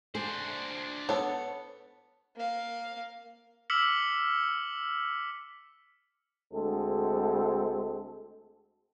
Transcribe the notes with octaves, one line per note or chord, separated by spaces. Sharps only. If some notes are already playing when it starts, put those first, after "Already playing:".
D4 G#4 C5
B3 A4 C#5
A#3 F5
D6 E6 F6 B6 C#7 F#7
D2 G#3 C4 A4